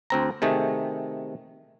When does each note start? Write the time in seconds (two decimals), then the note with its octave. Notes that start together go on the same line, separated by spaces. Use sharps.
0.10 D2 C4 A#5
0.42 C3 D#3 A3 G#4